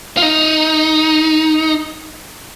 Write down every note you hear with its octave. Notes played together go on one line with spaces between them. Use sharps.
F4
D#4